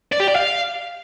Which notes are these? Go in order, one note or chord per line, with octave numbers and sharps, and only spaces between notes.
D5
G4
D5
F5